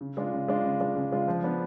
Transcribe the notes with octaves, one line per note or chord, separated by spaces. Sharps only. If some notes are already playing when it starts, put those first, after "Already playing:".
C#3
G#3 D4 F4
C#3
G#3 D4 F4
C#3
G#3 D4 F4
C#3
G#3 D4 F4
F3
B3 D4